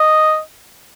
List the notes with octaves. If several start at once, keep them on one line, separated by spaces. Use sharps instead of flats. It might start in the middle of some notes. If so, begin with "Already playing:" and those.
Already playing: D#5